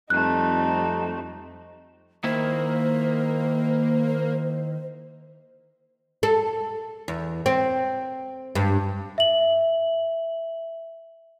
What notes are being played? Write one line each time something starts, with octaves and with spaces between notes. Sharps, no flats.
F2 G3 A3 C4 D#4 F#6
D#3 A#3 E4 C5
A4
E2
C4
G2
E5 F#7